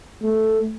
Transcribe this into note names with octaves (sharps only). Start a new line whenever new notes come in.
A3